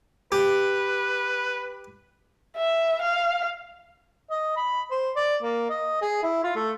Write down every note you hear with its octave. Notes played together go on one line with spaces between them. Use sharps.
G4 B4
E5
F5
D#5
B5
C5
D5
A#3
D#5
G#4
E4
F4
A3